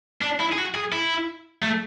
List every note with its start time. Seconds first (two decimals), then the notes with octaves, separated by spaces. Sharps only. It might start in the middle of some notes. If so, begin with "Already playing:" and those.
0.21 D4
0.40 E4
0.52 G#4
0.57 F#4
0.74 G#4
0.92 E4
1.62 A3